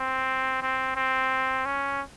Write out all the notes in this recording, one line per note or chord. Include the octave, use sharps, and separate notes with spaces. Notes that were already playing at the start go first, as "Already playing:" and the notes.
Already playing: C4
C4
C4
C#4